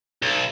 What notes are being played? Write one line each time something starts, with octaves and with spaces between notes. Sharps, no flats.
B1